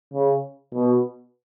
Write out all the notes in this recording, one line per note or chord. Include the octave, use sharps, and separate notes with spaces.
C#3
B2